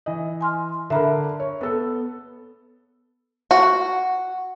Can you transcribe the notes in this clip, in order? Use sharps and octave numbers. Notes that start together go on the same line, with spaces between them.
E3 D#5
G#5 C6 F6
D3 A#4 E5 A#5 B5
C#5
B3 A4
F#4